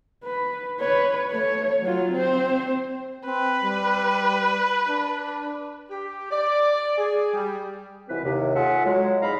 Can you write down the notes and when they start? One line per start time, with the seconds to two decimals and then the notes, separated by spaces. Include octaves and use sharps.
0.24 B4
0.80 B4 C#5
1.31 A3 C#5
1.82 F#3 F4
2.12 C4 C5
3.26 C4 B4
3.64 G3
4.88 D4
5.90 G4
6.31 D5
6.98 G#4
7.33 G3
8.09 C2 B2 E3 C4 B4
8.23 D#2 C3
8.56 F4 G#4 A4 E5 F#5
8.84 F#3 G#3
9.22 E2 G#2 D#4 F5 A#5 B5